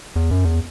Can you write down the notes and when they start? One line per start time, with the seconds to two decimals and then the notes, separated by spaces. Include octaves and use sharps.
0.16 E2
0.31 F#2
0.45 E2